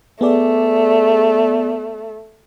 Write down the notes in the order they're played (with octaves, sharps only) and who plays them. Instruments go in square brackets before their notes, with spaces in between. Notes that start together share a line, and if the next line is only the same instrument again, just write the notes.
[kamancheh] A3 [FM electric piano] B3 G#4 D5